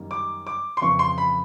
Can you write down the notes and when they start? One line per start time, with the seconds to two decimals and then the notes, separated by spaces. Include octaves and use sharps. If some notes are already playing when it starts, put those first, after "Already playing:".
Already playing: F#2 D#3 G3 A#3
0.11 D6
0.47 D6
0.77 C6
0.82 F2 C#3 E3 C#6
0.99 C6
1.18 B5